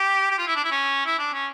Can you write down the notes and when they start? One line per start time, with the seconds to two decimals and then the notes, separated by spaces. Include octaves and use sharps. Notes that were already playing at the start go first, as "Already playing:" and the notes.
Already playing: G4
0.31 G4
0.38 F4
0.47 E4
0.56 D4
0.64 E4
0.71 C#4
1.06 E4
1.19 D4
1.33 C#4